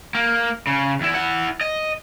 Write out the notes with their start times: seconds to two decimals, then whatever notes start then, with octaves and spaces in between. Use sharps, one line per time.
0.15 A#3
0.67 C#3
1.01 E2 E4
1.14 E4 F#5
1.61 D#5